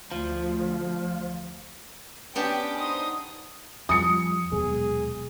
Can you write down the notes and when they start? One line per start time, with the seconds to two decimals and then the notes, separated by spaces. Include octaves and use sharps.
0.12 D2 F3
2.36 B3 C#4 D4 G4 G5
2.78 D#4 C5 D#6
3.89 F2 F3 G3 D#6 C#7
4.52 D#1 B2 F#3 G#3 G#4